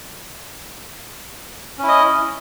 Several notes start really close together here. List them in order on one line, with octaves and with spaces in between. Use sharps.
C#4 E4 D#5